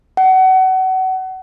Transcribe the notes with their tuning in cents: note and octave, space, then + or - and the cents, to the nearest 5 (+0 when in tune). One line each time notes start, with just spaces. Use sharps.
F#5 +30